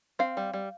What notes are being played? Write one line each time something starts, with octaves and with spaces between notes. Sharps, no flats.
C4 F5
G3
G3